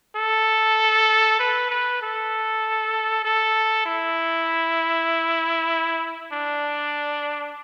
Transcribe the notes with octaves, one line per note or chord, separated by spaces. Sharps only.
A4
B4
B4
A4
A4
E4
D4